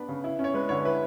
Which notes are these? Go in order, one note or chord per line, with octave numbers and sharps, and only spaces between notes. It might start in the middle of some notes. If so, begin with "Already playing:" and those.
Already playing: B3 D4 B4
C#3
E4
C#4
C#5
G#3 B4
D3 C#5
E4 B4